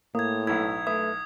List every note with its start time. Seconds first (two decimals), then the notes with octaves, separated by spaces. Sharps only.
0.15 A2 A#3 D#6 G#6
0.47 B1 E4 G#6
0.87 A3 B4 E5 D#6